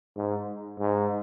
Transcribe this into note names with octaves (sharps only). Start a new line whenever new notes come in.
G#2
G#2